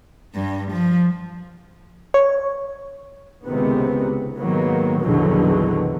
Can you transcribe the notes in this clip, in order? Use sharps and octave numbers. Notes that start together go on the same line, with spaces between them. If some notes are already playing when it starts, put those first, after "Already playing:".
G2
F3
C#5
C#2 C3 D#3 B3
G#2 D#3 F#3 A#3 B3
A#1 E2 B2 D3 D#3 F#3